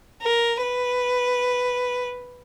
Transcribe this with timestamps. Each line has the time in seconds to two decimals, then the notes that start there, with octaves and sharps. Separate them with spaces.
0.22 A#4
0.62 B4